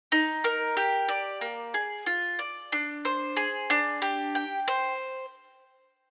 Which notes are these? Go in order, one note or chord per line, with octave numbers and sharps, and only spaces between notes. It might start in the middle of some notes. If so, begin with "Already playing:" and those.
D#4
A#4
G4
D5
A#3
G#4
F4
D5
D4
C5
G#4
D4
G4
G5
C5